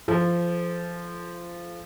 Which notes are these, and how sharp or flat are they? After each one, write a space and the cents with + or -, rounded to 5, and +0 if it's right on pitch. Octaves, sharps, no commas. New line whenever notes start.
F3 -15 A4 -30